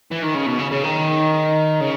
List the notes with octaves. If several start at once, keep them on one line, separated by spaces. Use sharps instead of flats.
E3
D#3
C#3
B2
C#3
C#3
D#3
C#3